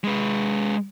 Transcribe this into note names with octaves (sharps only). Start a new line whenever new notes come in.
G#3 B4